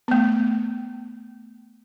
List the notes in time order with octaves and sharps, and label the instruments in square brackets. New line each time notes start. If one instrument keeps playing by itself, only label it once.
[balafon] A3 B3